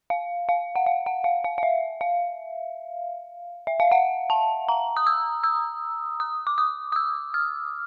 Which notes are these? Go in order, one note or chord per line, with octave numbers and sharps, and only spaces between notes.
F5
F5
F#5
F5
F#5
F5
F5
F5
E5
F5
E5
F5
F#5
A5
A#5
D#6
E6
E6
D#6
D6
D#6
D#6
E6
F6